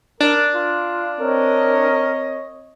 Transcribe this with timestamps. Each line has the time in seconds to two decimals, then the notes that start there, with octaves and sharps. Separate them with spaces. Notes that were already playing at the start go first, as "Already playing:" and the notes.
0.20 D4 A#4
0.55 F4
1.20 C4 A#4 C#5 D#5